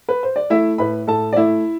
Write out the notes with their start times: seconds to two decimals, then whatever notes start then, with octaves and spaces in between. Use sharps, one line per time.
0.09 B4
0.23 C5
0.36 D5
0.50 A3 E4 E5
0.78 A2 B4 B5
1.07 A2 A4 A5
1.33 D5
1.36 A3 E4 E5